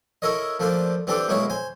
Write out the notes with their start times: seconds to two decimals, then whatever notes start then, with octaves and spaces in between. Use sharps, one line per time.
0.22 E4 A4 A#4 C#5 D#5
0.60 F3 A3 A#3 D4 C5
1.07 E3 C4 D4 G4 A4
1.28 B1 G#3 A#3 C#4 E4 C#5
1.50 C5 G#5